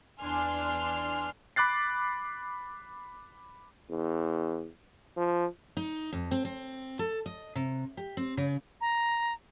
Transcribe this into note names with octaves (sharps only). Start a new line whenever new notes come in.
E2 D4 G#5 C6 F6
B5 D6 F#6 A6 C7
E2
F3
D#4
F2
C4
C4
A4
D#5
C3
G4
C4
C#3
A#5